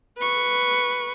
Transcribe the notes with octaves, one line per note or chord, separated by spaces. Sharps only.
B4 C#6